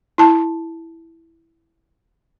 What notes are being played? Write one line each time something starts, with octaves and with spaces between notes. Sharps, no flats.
E4 A5